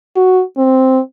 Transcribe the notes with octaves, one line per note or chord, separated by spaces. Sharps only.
F#4
C4